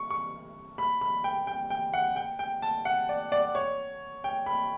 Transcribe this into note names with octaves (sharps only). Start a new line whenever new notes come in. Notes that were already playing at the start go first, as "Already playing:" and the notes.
Already playing: C#6
C#6
B5
B5
G5
G5
G5
F#5
G5
G5
A5
F#5
D5
D5
C#5
G5
B5